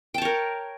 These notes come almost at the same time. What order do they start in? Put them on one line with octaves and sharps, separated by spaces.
G5 A5 C#5 A#4